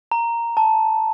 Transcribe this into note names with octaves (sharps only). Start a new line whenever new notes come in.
A#5
A5